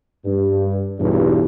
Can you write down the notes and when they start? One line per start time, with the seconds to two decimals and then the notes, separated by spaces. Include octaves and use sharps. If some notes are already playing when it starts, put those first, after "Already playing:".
0.25 G2
0.99 B1 E2 G2